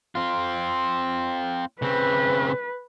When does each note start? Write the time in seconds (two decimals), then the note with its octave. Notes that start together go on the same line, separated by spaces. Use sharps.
0.15 C4 F4
1.82 C#3 C4 B4